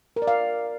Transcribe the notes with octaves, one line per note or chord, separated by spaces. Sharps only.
A#4
D5
F5